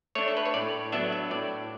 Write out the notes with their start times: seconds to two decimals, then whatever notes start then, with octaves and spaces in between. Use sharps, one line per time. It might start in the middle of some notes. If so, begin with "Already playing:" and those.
0.15 A3 D4 C#5
0.28 A4
0.37 B4
0.46 C#5
0.54 A2 D5
0.92 F#3 B3 D4 E5
1.12 E5
1.31 A2 D5